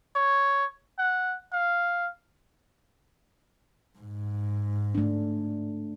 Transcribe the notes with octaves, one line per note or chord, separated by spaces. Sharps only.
C#5
F#5
F5
G#2
A3 D4